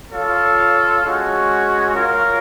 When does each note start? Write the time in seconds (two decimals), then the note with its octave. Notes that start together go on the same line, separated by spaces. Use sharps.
0.12 F4 A4 C#5 F5
1.03 G#3 C#4 F#4
1.94 F4 A#4 C#5 F5